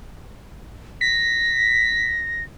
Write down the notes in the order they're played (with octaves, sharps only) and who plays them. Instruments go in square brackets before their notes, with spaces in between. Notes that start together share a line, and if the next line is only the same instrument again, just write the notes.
[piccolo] A#6 [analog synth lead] B6